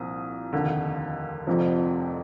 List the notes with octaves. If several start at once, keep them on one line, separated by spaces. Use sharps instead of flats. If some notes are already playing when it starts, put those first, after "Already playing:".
Already playing: C2 A#2 F3 D#6
F1 D#2 D3
F1 F2 C3 F3